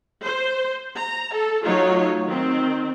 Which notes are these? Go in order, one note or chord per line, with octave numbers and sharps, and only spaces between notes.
C5
A#5
A4
F#3 A3 D#4 F4 C#5
D#3 C4